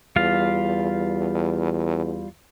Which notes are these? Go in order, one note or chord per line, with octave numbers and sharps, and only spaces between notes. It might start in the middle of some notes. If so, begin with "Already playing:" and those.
E2 G3 F4 F5